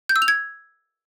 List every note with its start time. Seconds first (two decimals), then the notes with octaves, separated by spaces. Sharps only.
0.09 G6
0.16 E6
0.22 F7
0.28 G#6